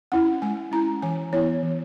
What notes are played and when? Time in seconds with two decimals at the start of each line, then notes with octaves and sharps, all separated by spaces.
0.12 C#4 E4 F#5
0.42 G#3 G#5
0.72 C#4 E4 A#5
1.02 E3 G#5
1.33 B3 E4 C#5
1.63 E3